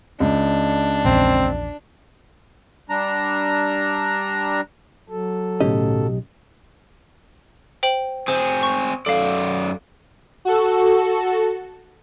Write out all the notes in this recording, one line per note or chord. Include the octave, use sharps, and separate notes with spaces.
C#2 D4
A#1 E2 C4
G3 D4 A#5
F#3 A4
B1 A2 C#3 C#4 G4 D#5
C5 G5 F#7
C4 G#4 C5
C#6
F#2 A4 D5 F5
F#4 A4